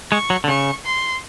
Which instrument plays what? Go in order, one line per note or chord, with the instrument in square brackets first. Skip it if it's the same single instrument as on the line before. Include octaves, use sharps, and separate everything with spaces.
[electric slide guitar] G#3 [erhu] C#6
[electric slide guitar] F#3
D3
[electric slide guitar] C#3 [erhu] C#6
[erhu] C6